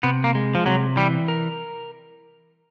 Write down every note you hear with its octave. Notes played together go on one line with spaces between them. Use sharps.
C3 B3
A#3
G#3
F3
C3 F#3
E3 G3
A#4